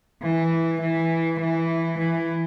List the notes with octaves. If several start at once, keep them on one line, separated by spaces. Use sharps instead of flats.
E3
E3
E3
E3